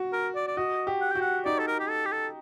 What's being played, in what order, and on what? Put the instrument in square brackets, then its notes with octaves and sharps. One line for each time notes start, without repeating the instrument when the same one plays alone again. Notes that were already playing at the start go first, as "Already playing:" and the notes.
Already playing: [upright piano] F#4
[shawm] A#4
D5
D5
[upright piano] F#4 [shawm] D#5
[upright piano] G4
[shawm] F#5
[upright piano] F#4 [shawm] G5
[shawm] F#5
[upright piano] D#4 [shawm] D5
[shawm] A4
A#4
G4
A4
G4
A4